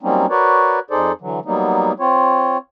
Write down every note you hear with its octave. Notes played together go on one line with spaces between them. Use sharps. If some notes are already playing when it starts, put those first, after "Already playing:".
F#3 G3 A#3 C4 C#4 D#4
F#4 A#4 B4 C#5 D5
F2 D#4 G#4 A4 C5 D5
D3 E3 F#3
F#3 G3 A#3 B3 D#4
C4 F4 C#5